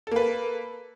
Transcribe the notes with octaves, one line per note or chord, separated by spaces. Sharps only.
A#3 A4 B4